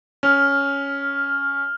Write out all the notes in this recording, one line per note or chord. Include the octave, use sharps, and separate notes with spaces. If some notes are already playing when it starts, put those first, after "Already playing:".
C#4 F6 F7